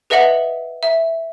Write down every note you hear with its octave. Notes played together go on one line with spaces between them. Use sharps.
G#4 B4 D#5 E5 F#5 F#7
E5